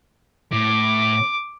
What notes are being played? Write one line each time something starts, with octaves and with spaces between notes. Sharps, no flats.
A2 D6